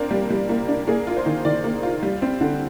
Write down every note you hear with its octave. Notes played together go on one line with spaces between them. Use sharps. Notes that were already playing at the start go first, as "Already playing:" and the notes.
Already playing: A#3 C4 D4
G3
G3
A#3
D4
A#3 G#4
F4
C5
D#3
D#3 D5
A#3
F4
G3
C4
D3